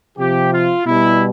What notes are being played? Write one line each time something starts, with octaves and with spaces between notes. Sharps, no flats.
C3 F3 G4
F4
B2 G3 E4